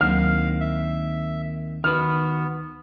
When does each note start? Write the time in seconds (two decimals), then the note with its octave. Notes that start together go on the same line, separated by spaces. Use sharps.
0.01 D2 D#3 F#3 A#3 C4 F5 F6
0.60 E5
1.84 D#3 B3 F#4 B4 F6